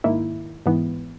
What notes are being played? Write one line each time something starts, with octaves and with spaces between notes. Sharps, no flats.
G#2 D#3 A#3 E4
G#2 E3 B3